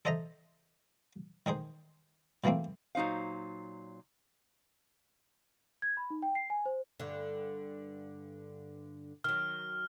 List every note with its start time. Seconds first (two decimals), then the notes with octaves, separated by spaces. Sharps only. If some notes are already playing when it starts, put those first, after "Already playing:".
0.05 A4 C5 D#5 E5 A#5
1.46 D#3 D#4 G#4 C5
2.44 B2 E3 A3 A#3 C4
2.95 A#2 F#3 D#4 C5 F5
5.82 G#6
5.97 B5
6.10 D#4
6.22 G5
6.35 C7
6.50 G#5
6.66 C5
7.00 G2 D3
9.24 D#3 F#3 F6